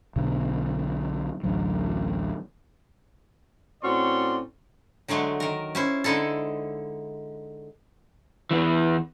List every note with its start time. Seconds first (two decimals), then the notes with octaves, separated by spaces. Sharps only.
0.16 B1 B2 D3 B3
1.43 A1 D2 F#3
3.83 A2 C4 C#4 F#4 D5 C6
5.08 D3 F#3 G#3 A3
5.40 D#3 A#4
5.75 C#4 E4 C5
6.04 D3 G#3 D#4 E4 A4
8.51 E2 E3